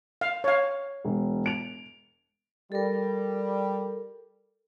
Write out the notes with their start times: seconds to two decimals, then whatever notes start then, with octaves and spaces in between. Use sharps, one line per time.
0.21 F5
0.44 C#5 F5
1.05 E1
1.46 D7 F7
2.72 G3 A4 A#4